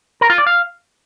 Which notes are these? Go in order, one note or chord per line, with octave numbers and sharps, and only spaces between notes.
A#4
F4
D5
F5